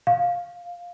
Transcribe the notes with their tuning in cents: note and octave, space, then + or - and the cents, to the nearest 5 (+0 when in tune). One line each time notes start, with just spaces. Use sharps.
F5 +10